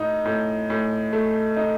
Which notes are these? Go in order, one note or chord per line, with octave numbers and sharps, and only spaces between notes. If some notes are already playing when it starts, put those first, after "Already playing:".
Already playing: A2 D#4
A2
A2
A3
D#4